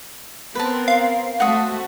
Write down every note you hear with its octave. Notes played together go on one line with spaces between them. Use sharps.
B3 C4 A#4 B4 A5
F5
A3 C4 F#4 F#5 D#6